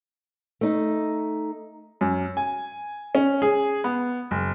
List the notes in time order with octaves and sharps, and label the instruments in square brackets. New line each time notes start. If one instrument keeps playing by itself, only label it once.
[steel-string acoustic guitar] A3 D#4
[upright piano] F#2
G#5
C#4
G#4
B3
F#1